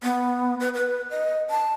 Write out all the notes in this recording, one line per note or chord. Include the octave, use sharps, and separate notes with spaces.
B3
B4
B4
D#5
A5